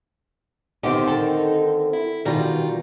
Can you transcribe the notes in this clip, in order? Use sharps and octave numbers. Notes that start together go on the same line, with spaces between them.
D3 D#3 C4 D#4 G4
A4 A#4
E4
B2 D#3 E3 G3 F4 A#5